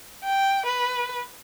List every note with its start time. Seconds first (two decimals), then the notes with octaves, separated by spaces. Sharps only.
0.24 G5
0.66 B4